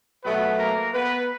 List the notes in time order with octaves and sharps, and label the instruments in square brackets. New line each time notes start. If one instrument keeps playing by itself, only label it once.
[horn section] B2 F#3 A3 B3 B4
A#3 A#4
B3 B4